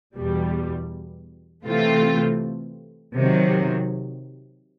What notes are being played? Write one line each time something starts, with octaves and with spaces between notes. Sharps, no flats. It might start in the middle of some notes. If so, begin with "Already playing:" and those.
E2 B2 G3
C3 E3 A3 C4 F4
C3 D#3 F#3